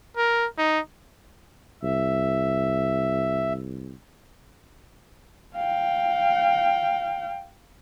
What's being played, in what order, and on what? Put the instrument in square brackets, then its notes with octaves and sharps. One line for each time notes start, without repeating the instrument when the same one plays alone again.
[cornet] A#4
D#4
[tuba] C2 [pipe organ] E5
[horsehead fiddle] F5 G5